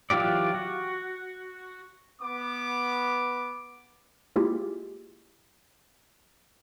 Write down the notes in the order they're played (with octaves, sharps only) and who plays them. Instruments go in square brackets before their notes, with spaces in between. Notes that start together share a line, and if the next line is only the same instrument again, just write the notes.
[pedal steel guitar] E3 F#3 F4 G4 D5
F#4
[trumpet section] B3 D6
[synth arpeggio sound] G#3 A#3 E4 F4 G4 G#4